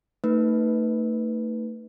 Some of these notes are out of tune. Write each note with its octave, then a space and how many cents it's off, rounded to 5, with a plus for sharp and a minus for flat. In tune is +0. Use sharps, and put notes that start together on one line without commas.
A3 +40 D#4 +0 B4 +0